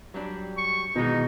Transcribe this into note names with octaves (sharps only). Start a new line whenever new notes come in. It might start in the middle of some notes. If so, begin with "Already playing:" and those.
F#3 G3 D4
C#6
B2 D#3 E3 G#3 D#4